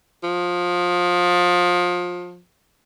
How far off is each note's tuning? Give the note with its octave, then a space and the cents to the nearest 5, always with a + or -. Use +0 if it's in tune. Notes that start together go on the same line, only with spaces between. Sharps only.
F3 +25